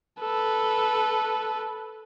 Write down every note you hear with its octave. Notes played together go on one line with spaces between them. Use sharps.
A4 B4